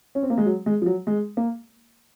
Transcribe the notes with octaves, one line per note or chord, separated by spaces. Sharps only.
C#4
C4
A#3
G#3
F#3
G#3
F3
F#3
G#3
A#3